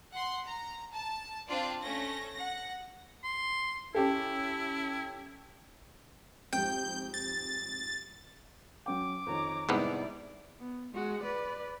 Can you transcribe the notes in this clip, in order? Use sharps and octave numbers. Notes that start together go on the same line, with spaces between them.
F#5 C6
A#5
A5
C4 D4 F4 D5
A3 C#4 A#6
F#5 A#6
C6
C#4 E4 G4 A4
F2 G#2 G3 G5 G6
A6
F#3 C#4 G5 D6
F2 D#3 C#5 A#5
C2 G#2 B3 E4 D5
B3
G#3 F#4
B4 D5